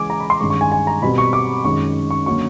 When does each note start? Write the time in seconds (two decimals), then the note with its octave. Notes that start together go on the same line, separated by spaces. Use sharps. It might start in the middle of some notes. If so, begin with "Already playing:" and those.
Already playing: C#3 E3 G#3 C#4 G#5 D6
0.10 A#5
0.20 B5
0.30 C6
0.40 G2 D#3 G#3 C#4 C#6
0.50 C#6
0.61 G#5
0.72 G#5
0.87 A#5
1.02 B2 G3 C4 B5
1.18 C#6
1.33 D6
1.65 F#2 D#3 G#3 C#6
2.11 C#6
2.26 D3 F#3 A#3 C#4 C#6